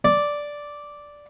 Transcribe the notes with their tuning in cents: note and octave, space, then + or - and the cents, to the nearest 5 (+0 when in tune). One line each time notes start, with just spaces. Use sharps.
D5 -5